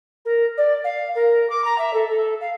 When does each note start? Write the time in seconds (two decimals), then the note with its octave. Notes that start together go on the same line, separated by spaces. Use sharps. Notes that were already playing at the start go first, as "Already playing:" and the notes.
0.25 A#4
0.57 D5
0.84 F5
1.15 A#4
1.49 D6
1.64 A#5
1.78 E5
1.93 A4
2.08 A4
2.40 F5